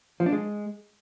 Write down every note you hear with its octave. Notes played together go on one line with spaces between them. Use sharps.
F3
D4
G#3